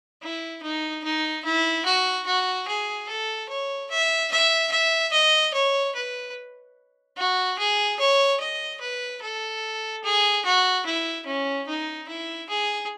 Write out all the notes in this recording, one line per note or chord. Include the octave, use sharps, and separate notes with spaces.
E4
D#4
D#4
E4
F#4
F#4
G#4
A4
C#5
E5
E5
E5
D#5
C#5
B4
F#4
G#4
C#5
D#5
B4
A4
G#4
F#4
E4
C#4
D#4
E4
G#4